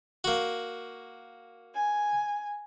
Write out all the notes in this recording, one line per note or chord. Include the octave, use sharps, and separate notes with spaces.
A#3 F#4
G#5